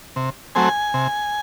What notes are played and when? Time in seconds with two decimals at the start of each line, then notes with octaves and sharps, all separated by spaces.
0.16 C3
0.55 F#3 A3 C4 G#5
0.94 C3